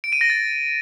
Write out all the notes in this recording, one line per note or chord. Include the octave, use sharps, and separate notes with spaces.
D7
D#7
A#6
A6